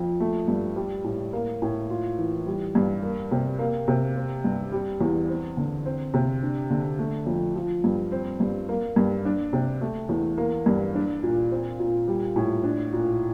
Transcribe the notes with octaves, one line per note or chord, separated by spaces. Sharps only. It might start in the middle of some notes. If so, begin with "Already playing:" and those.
Already playing: F2
A3
G2
G3
A2
A#3
A2
F4
E3
G3
G2
A#3
C3
A#3
C3
C4
G2
G3
E2
C4
D3
C4
C3
D4
D3
A3
F2
F3
G2
C4
G2
A#3
G2
D4
C3
A3
E2
A#3
G2
D4
A#2
C4
A#2
G3
A2
D4
A#2